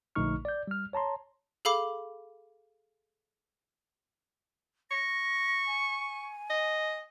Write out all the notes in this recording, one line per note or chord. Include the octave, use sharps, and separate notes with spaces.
A#1 D3 A3 D#4 C#6 F6
D5 G6
G3 F6
C#5 A5 A#5 C6
G#4 A4 F5 B5 D6
C#6 A#6
G#5
D#5